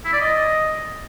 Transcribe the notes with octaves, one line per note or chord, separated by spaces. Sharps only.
E4
D5
D#5